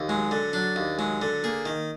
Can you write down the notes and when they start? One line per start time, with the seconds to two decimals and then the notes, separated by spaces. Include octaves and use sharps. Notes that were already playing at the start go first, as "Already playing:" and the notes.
Already playing: D#2
0.09 F#3 G#3
0.31 D3
0.53 F#3 D4
0.76 D#2
0.98 F#3 G#3
1.22 D3
1.43 A#3 G#4
1.65 D#3